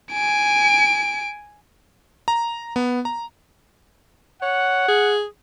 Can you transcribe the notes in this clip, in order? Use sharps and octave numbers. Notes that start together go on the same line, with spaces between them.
G#5 D7
A#5
B3
A#5
C#5 F#5
G#4